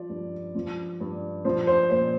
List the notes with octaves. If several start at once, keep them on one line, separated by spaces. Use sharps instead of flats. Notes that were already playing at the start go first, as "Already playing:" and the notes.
Already playing: F3 D5
G2
F3
G2
F3 C5
C5
A#2 C5